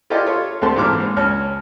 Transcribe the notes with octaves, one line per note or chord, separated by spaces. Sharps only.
E4 F4 G4 A4 D5 D#5
F4 A4 C#5
D2 A3 C4 A4 A5 C6
G#1 A#2 E3 D6 F6
G#2
C#2 C#4 C#5 A5 F6